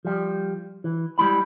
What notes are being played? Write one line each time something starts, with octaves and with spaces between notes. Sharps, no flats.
F3 G3
E3
G3 G#3 E4 B5